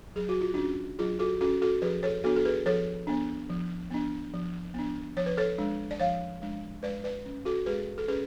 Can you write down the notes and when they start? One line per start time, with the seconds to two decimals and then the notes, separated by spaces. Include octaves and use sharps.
0.15 F#3 G#4
0.29 F#4
0.41 F4
0.54 C#4 D4 F#4
0.99 F#3 F4 G#4
1.19 F#4 A4
1.41 C#4 F#4 A4
1.62 F#4 A4
1.82 F3 G#4 B4
2.03 A4 C#5
2.24 B3 D4 F#4 A4
2.36 A4
2.45 G#4 B4
2.66 F3 A4 C#5
3.07 B3 D4
3.49 F3
3.90 B3 D4
4.33 F3
4.74 B3 D4
5.16 F3 C#5
5.26 B4
5.37 A4 C#5
5.58 G#3 D4
5.91 D5
5.99 F3 C#5 F5
6.42 G#3 D4
6.83 G#3 B4 D5
7.04 B4 D5
7.26 C#4
7.45 F#4 A4
7.66 G#3 G#4 B4
7.98 A4
8.08 C#4 G#4 B4